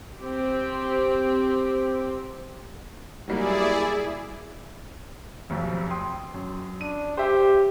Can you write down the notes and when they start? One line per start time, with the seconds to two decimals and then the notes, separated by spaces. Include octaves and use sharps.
0.17 C4 G4
3.28 F#3 G3 A#3 E4 G#4 D5
5.50 F1 B1 F2
5.90 G5 C6 D#6
6.34 F#2
6.81 D4 D#7
7.17 G4 C5 E5